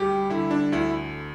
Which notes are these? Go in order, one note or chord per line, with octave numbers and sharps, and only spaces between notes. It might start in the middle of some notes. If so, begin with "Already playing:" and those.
Already playing: D2 G3 G4
D3 E4
D4
D2 E4